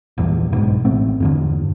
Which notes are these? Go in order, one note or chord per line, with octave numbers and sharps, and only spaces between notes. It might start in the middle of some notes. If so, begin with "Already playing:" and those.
A#1 E2 G2
B1 G#2
A1 A3 C4
E2 G2 D3